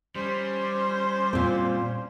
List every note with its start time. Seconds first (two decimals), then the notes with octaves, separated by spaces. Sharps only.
0.16 G3 C#4 C5
1.33 A#2 C4